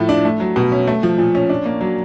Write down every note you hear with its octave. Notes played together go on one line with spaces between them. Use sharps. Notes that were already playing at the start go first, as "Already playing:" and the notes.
Already playing: A2 F3 A3
D4
A3
F#3
B2
C#4
A3
F3
A#2
C#4
D4
A#3
F#3